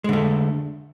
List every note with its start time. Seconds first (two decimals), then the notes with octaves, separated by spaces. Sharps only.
0.04 G#3
0.09 D3
0.13 A3